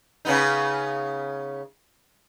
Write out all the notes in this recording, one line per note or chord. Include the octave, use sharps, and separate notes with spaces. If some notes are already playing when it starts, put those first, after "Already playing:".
C#3 B3 D#4